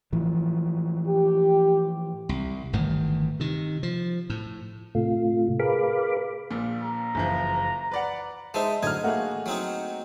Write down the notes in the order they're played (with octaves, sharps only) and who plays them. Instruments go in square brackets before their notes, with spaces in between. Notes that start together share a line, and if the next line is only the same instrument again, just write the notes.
[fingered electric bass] A2 E3 F3
[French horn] G4
[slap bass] C2
G1 A2 D#3 E3
C3 D#3
F3
A2
[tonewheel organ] A2 C3 A3 F4
G#4 A#4 B4 F5 B5 D6
[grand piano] A#1 A#2
[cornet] A#5
[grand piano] F#1 E3 F3
B4 D5 F#5
[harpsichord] G#3 D#4 [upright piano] C5 E5 A5
[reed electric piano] A2 D3 F#3 [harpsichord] D#4 D#5 [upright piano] F6 G#6
[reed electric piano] A3 A#3 [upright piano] F#4 G#4
[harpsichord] F#3 C4 D#4